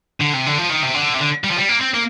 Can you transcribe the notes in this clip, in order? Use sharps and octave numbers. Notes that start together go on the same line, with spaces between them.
D3
C3
D3
F3
D#3
C3
D3
C3
D3
G3
F3
G3
A#3
C4
A#3